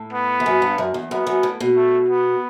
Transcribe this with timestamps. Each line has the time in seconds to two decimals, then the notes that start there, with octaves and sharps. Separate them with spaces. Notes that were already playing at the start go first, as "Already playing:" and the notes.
Already playing: A2
0.13 B3
0.40 E2
0.46 F#2
0.62 G2
0.78 F#2
0.94 E2
1.11 F#2 B3
1.27 F#2
1.43 A2
1.60 B2
1.76 A3
2.09 B3